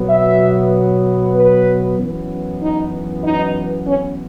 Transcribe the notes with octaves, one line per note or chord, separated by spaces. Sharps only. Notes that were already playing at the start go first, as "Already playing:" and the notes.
Already playing: B2 F#3 B3
E5
B4
F#2 E3 B3
D#4
D#4
C#4